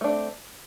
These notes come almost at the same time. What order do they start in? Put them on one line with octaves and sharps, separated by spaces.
A3 D4 C4